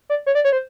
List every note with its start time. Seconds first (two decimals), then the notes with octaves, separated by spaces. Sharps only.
0.10 D5
0.26 C#5
0.35 D5
0.45 C#5
0.53 C5